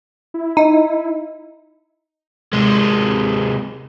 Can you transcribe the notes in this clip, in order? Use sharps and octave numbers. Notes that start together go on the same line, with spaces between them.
E4
D#4
C3 G#3